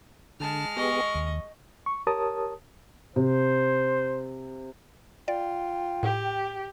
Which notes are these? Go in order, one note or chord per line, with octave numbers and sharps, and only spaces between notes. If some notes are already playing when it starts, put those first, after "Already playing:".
D3 G#3 A5 F6
B3 G4 G#4 D#5 C#6
D#2
C#6
G4 A#4 C#5 A5 D#6
C3 C5
F4 D5 G5
A2 G4